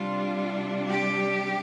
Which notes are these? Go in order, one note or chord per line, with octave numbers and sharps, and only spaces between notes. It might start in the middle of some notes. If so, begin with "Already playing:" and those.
Already playing: C3 G3 D4 F4
G4